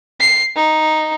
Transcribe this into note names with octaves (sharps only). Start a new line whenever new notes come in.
C7
D#4